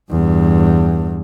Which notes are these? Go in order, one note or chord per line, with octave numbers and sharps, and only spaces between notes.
E2 G2